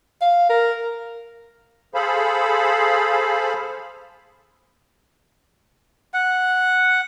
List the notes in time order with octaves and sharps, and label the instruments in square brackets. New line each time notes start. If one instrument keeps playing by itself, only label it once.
[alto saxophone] F5
A#4
[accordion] G#4 A4 C5 F5 B5
[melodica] F#5